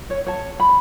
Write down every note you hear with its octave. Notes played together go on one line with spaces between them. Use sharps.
C#5
C#5 A5
B5